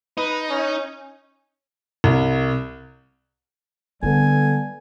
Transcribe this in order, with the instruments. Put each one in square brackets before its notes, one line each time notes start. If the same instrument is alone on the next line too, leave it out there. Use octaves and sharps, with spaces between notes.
[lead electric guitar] D#4 [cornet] B4
[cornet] C#4
[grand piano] C2
[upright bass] D3 [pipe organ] G3 [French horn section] B3 A4 [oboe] G#5